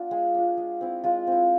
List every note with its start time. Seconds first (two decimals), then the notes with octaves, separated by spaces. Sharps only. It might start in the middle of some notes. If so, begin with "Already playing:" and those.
Already playing: B3 D4 F4
0.11 G#3 G#4
0.35 D4 F4
0.57 G#3
0.81 C4 E4
1.04 G#3 F4
1.27 C4 E4